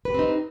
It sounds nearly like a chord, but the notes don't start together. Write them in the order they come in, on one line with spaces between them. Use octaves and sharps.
B4 G4 C4 D#4